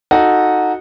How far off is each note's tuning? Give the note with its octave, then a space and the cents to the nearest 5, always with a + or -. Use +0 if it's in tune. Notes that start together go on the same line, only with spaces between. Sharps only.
D#4 +0 F#4 -15 A4 +0